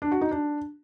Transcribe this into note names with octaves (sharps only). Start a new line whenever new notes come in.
D4
F#4
D#4
D4